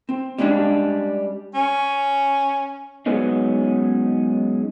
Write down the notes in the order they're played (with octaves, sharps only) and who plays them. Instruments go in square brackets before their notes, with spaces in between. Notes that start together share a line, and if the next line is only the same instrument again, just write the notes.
[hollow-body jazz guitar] C4
G3 G#3 C#4 D4
[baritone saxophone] C#4
[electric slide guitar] F#3 G#3 B3 C#4 D#4